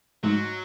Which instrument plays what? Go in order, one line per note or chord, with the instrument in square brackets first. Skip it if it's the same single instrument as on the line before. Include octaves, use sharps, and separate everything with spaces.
[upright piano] G#2 [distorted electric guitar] F#3